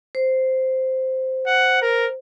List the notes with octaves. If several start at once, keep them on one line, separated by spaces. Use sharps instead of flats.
C5
F#5
A#4